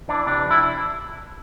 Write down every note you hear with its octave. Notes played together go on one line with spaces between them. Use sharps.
E3 D4
C3 D4
F2
E4